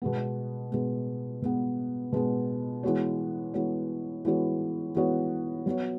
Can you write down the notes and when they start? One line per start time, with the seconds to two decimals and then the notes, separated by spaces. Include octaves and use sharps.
0.02 B2 G#3 B3
0.72 B2 G#3 B3
1.42 B2 G#3 B3
2.12 B2 G#3 B3
2.83 E3 G#3 B3 F#4 C#5
3.54 E3 G#3 B3 F#4 C#5
4.25 E3 G#3 B3 F#4 C#5
4.95 E3 G#3 B3 F#4 C#5
5.66 F#3 B3 F#4 C#5